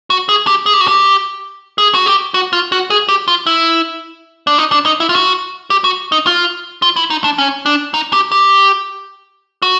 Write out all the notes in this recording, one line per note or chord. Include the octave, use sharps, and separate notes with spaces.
F#4
G#4
G4
G#4
G4
F#4
G4
G#4
F#4
G4
F#4
F4
F#4
G#4
G4
F4
E4
D4
D#4
D4
D#4
E4
F4
F#4
G4
F#4
D#4
F4
F4
E4
D#4
D4
C#4
D4
D#4
G4
G4
F#4